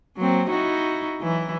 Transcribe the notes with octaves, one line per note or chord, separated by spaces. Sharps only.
F#3 A#3 C4
D#4 E4 F#4
E3 F#3 E4